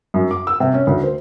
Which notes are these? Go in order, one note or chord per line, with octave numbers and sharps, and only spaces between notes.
F#2
D6
E6
C3
C#4
D2
C5